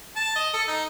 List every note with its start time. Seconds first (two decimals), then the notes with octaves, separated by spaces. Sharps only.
0.16 A5
0.36 D#5
0.54 A4
0.68 D#4